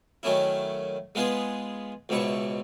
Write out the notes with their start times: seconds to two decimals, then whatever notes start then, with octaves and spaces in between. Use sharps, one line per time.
0.23 D#3 F#3 A3 C#4 E4
1.15 G#3 B3 F4 G#4 B4
2.09 C#2 G#2 B2 E4 C#6